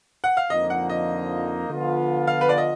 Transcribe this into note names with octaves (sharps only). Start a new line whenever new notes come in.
F#5
F5
F2 D3 F3 A#3 D#4 D#5
F#5
D#5
D3 F3 B3 F4
F5
B4
D5
D#5